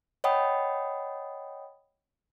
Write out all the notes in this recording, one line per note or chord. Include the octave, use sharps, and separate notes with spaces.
C#5 D#5 F#5 G5 B5 D#6